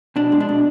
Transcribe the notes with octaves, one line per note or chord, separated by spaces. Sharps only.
B2 D4
G#3
D4
B2